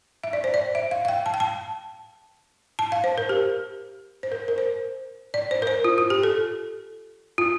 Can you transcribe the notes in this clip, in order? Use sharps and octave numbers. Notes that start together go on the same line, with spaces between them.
E5
D5
C5
D5
E5
F5
F5
G5
A5
G5
A5
A5
F5
C5
A#4
G4
C5
A#4
A#4
C5
D5
C5
A#4
C5
F4
F4
G4
A4
F4